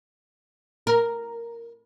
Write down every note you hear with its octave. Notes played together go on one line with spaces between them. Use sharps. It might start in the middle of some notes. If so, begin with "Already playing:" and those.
A#4